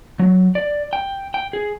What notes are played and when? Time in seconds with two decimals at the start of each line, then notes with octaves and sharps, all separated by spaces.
0.19 F#3
0.55 D5
0.93 G5
1.34 G5
1.53 G#4